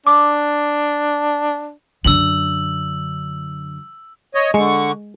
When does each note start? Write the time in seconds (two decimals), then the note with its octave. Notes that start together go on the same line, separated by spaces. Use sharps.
0.07 D4 D6
2.05 F#2 D3 E6 F#7
4.35 C#5 D#5
4.54 D3 G#3 C#6